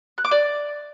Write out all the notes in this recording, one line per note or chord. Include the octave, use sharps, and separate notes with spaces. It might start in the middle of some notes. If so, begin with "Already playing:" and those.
F#6
D6
D5